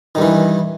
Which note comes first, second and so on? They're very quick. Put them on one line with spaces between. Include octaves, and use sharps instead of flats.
D#3 G2 E3